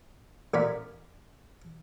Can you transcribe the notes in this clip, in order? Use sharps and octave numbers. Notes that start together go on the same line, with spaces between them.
A1 A#4 D5 F5 B5